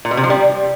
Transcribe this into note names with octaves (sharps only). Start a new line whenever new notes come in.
A#2
B2
C3
F3
G3